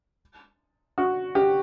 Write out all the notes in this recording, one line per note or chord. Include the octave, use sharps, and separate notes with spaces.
F#4
G4